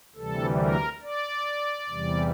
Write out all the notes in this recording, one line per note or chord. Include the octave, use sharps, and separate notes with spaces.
D2 C3 E3 G3 A4
A#4
D5
E2 C3 E3 G3